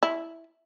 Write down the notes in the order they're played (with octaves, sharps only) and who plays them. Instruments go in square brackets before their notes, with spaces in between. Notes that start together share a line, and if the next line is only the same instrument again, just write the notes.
[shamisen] E4